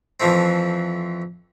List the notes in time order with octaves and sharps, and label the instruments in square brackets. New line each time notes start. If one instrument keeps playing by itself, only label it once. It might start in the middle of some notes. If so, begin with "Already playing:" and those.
[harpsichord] F2 E3 F3 A3 C4